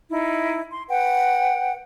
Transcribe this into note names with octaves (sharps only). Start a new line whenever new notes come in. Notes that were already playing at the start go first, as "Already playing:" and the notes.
D#4 E4
C6
B4 F#5 G5